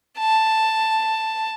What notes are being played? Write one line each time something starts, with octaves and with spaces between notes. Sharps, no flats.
A5